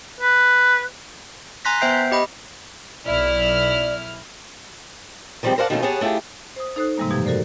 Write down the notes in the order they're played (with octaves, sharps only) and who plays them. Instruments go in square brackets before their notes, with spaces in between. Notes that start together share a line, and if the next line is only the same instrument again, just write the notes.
[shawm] B4
[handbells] G#5 A#5 C6 F#6 A#6 B6
B3 C5 E5 G5 G6 C7
G4 D#5 B5
[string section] B1 E4 F6 [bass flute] D5
[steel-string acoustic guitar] D#3 F3 G3 G#3 C4
A#4 C5 D5 F5 F#5 A5
B2 D#3 F3 A3 A#3 C#4
B3 G4 G#4 C#5 F#5 A5
A3 E4 F4 G4 G#4
[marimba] C5 D#6
D#4 A4 C5 D#6 F#6
G#2 C3 E3 G3 G#3 A#3
F#2 B2 F3 G4 G#6
F#4 A4 A#4 C5 D5